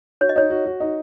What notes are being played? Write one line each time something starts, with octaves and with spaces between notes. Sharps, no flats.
F#4 C#5
D#5
D#4 C#5
F#4
F#4
D#4